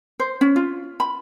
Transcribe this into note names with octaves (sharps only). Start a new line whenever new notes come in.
C5
C#4
F4
B5